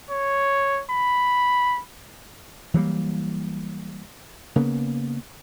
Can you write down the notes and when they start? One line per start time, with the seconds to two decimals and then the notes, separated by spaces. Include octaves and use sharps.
0.10 C#5
0.91 B5
2.74 E3 F#3 G3 A#3
4.56 C#3 A#3 B3